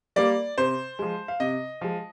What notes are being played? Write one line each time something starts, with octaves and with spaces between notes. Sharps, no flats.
G3 A#3 D5
C3 C5
F3 G#3
F5
C3 D#5
F3 G#3